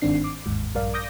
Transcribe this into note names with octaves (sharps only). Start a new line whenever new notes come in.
G1 G#2 D#3 C4 D4 C7
D6
G1 D#2 G#2
A#1 G2 A#4 D5 F5
D6 D#6 G6 A#6